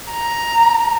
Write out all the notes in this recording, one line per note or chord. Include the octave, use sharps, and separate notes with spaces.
A#5